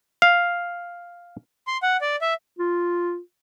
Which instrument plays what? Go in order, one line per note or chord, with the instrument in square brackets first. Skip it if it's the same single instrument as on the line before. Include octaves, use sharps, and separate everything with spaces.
[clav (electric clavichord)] F5
[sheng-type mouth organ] C6
F#5
D5
E5
[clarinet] F4